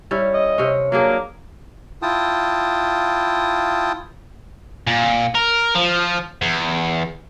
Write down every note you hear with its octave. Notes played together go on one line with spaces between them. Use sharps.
G3 C#4 E4
D#5
C3 C#4
F#3 A#3 D4 G#4
E4 F4 G5 A5 D#6
A#2
A#4
F3
E2